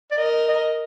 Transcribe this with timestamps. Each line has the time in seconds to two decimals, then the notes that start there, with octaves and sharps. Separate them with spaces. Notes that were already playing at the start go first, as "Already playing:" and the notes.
0.11 D5
0.18 A#4 D#5
0.48 D#5